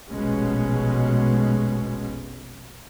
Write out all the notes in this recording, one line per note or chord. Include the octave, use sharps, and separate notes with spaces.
F1 A#1 B2 G#3 C#4